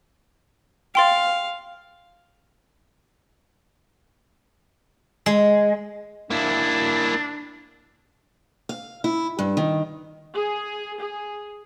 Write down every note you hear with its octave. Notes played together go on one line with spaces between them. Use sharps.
F5 G5 C6 A6
G#3
A#3 D4 E4
F5
E4
G2
D#3
G#4
G#4